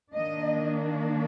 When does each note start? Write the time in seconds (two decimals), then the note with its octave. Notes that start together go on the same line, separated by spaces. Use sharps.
0.13 D#3 A#3 D4 D#5